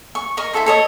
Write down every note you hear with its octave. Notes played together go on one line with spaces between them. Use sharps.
C#6
A#4 D#5 C#6
E4 F4 A4 C5
A4 C#5 D#5